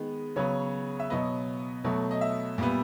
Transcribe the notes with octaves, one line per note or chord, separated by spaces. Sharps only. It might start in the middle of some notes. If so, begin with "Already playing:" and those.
Already playing: D#3 G#3 B3
C#3 F#3 B3 C#5
E5
B2 F#3 B3 D#5
B2 F#3 A3
D#5
E5
A#2 G3 B3